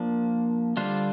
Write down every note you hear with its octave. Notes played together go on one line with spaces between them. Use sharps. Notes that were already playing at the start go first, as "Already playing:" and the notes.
Already playing: F3 A#3 D4
D3 G3 D4 F4 C5